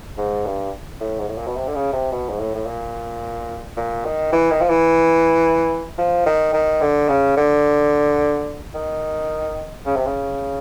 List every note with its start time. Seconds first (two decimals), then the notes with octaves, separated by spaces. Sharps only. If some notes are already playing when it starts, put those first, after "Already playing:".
0.18 G#2
0.46 G2
1.01 A2
1.19 G#2
1.28 A2
1.38 A#2
1.47 B2
1.56 C3
1.67 D3
1.75 C#3
1.93 C3
2.12 B2
2.30 G#2
2.39 A2
2.55 A2
2.67 A#2
3.77 A#2
4.05 D#3
4.33 E3
4.51 D#3
4.61 F3
4.70 E3
5.98 F3
6.26 D#3
6.54 D#3
6.81 D3
7.09 C#3
7.37 D3
8.75 D#3
9.86 C#3
9.96 C3
10.06 C#3